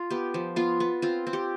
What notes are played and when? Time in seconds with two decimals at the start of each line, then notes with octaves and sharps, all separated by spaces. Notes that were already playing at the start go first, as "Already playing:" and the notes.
Already playing: F4
0.10 B3 G4
0.34 F3
0.56 B3 F4
0.80 B3
1.02 C4 F4
1.27 C4
1.33 G4